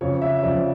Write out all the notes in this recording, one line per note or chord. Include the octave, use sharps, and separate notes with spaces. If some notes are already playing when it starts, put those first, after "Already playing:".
F2 C#3 F3 C#5
E5
F2 C#3 F3 D5